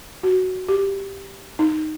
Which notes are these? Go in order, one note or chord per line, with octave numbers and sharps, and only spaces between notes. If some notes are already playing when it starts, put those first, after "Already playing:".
F#4
G4
D#4